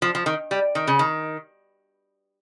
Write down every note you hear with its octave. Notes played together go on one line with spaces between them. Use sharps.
F3
F3
D#3
G3
D#3
C#3
D#3